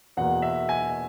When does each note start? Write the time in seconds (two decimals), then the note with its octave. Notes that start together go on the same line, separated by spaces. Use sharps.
0.17 E2 B2 A#3 F#5
0.42 E5
0.69 G#5